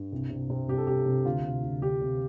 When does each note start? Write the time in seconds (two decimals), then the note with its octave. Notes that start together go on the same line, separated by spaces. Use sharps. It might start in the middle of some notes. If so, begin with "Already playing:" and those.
Already playing: G2
0.12 C2
0.30 C3
0.50 C3
0.68 C2 G4
0.78 A4
0.87 C2 G4
1.06 C3
1.25 D2 F4
1.45 C3
1.63 D2
1.82 D2 G4
2.02 C3